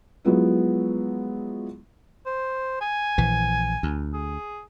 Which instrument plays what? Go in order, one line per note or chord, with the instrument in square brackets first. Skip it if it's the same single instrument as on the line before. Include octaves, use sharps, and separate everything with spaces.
[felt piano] F3 F#3 G#3 B3 E4
[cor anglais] C5
G#5
[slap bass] A#1 E3
D2
[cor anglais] G#4